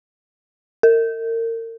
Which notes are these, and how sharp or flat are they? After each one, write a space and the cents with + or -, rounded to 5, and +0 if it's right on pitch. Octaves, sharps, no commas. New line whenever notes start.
A#4 -35